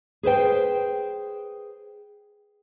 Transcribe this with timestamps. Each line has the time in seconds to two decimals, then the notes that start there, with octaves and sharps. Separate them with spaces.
0.23 G#4 B4 C5 G5